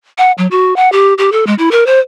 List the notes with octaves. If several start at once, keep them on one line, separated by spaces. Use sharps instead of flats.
F#5
F#3
F#4
F#5
G4
G4
A4
G#3
E4
A#4
C5